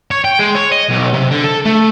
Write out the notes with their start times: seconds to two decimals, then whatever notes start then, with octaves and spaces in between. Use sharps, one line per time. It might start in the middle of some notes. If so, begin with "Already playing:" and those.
0.11 C#5
0.25 G5
0.39 G#3
0.55 C#5
0.72 D#5
0.89 B1
1.13 C3
1.31 D3
1.44 A4
1.66 A3